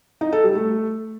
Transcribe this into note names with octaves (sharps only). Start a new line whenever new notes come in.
D#4
A4
G3
A3